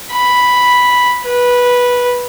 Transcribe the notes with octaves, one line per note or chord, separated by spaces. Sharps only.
B5
B4